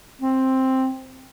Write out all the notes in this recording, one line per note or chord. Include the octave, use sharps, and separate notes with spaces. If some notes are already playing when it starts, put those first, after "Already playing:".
C4